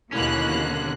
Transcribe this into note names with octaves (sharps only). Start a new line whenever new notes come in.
D#2 B2 D3 A#3 C#4 E4 F#6